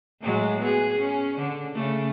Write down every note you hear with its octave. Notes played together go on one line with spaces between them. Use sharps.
A2 F#3 G#3
B3 G#4
C#4
D3
C#3 A3